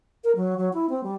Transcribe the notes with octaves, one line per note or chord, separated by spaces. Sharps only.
A#4
F#3
F#3
E4
C4
G3